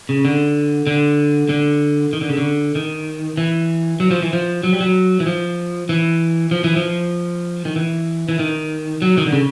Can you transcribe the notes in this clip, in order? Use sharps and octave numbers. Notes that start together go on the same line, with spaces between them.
C#3
D3
D3
D3
D#3
D3
C#3
D3
D#3
E3
F#3
F3
E3
F3
F#3
G3
F#3
E3
F3
E3
F3
E3
F3
D#3
E3
E3
D#3
F#3
D#3
D3
C#3